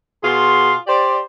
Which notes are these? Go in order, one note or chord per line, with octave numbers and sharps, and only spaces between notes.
B2 F4 F#4 G#4 C6
G4 C5 D5